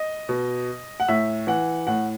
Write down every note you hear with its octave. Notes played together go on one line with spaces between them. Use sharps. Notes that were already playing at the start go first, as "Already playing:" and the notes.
Already playing: D#5
B2
F#5
A2 E5
E3 F#5
A2 F#5